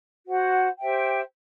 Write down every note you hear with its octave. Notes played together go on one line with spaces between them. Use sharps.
F#4 C5 F#5
G4 C5 E5 G5